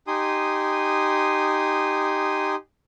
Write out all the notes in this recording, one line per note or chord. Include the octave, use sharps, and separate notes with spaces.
D#4 G4 G#5 C6 D#6